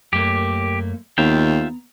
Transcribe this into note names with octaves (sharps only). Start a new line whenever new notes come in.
F#2 A3 A#3 G4
D#2 B3 F4 E5 G5 A#5